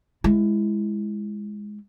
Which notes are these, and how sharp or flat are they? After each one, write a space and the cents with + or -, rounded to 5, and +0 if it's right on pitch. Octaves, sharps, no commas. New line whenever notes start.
G#3 +0 E4 +15